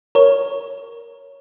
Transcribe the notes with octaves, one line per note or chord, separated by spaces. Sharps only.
A#4 C#5